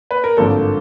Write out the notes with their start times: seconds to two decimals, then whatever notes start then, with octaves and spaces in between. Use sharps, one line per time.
0.11 B4
0.24 A#4
0.37 G#1 G2 D3 F3 A#3 A4